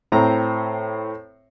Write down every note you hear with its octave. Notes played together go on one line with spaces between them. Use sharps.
A2 C4 A#5